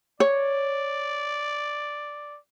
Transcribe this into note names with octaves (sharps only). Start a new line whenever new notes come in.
C#5 D5